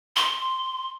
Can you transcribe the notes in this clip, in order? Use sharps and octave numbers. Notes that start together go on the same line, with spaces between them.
C6